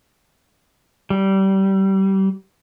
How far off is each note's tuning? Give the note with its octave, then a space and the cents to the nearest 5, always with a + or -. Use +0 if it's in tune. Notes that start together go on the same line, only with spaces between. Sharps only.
G3 -25